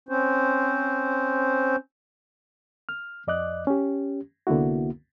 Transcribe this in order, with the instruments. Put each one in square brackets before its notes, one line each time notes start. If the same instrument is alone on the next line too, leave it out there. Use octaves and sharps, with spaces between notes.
[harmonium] C4 C#4 C5
[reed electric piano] F6
F2 D5 D#5 D6 F#6
C#4 G4
C2 D3 A#3 B3 E4 F#4